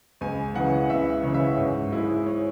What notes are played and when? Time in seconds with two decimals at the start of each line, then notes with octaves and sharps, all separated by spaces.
0.21 C#2 G#5
0.55 C#3 E3 F#5
0.90 C#2 E5
1.23 C#3 E3 C#5
1.34 E5
1.45 C#5
1.57 G#2
1.92 G#3 E4
2.26 C#5